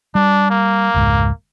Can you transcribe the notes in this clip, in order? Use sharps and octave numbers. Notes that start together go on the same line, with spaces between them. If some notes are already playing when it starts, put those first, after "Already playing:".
G3 D4
A#3
F1 C#2 G#2